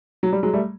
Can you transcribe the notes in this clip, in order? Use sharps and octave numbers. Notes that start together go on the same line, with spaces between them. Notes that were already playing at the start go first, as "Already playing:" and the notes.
F#3
G3
F#3 G#3
G3 A3